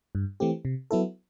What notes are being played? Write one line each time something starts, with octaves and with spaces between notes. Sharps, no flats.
G2
E3 A3 C4 G4
C3
F#3 B3 E4 A4